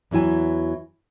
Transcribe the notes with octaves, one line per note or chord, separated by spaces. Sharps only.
E2 E3 F#3 E4 G#5